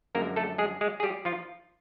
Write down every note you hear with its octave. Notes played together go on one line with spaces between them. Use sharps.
F#2 D3 F3 G#3 A#3 A#4
A3 A4
G#3 G#4
G#3 G#4
G#4
G3 G4
F3 F4